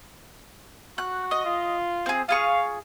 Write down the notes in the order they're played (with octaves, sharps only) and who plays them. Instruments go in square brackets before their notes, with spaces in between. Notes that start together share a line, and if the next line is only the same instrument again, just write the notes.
[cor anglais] F#4 [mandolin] F#6
[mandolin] D#5
[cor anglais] F4
[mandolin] C4 G#4
[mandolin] F4 G#4 C#6 [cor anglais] F5